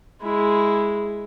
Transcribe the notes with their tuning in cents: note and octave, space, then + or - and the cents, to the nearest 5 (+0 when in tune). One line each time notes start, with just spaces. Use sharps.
G#3 +0 E4 +0